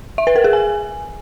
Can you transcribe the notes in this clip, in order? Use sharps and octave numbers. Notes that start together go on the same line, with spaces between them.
E5
B4
A#4
G#4
G#5